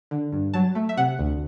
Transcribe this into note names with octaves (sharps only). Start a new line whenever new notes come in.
D3
G2
F#3 A5
A3
E5
C3 F#5
D2